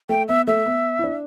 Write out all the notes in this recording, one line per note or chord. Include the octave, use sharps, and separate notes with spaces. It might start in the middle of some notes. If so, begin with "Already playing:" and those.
A3 G5
B3 E5
A3 E5
B3
E4
D4